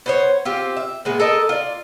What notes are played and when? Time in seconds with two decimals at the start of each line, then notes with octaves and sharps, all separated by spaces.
0.06 B3 C5 C#5
0.45 C4 F4 G4
0.77 E5
1.05 A#2 G#3 B3
1.20 A4 A#4 D#5
1.49 F4 D5